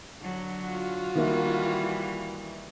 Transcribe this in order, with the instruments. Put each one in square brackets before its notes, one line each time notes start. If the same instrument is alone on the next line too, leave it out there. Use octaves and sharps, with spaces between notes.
[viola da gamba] D3 F#3
[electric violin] F4 F#4
[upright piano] D#3 A#3 E5 [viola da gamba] E3 G3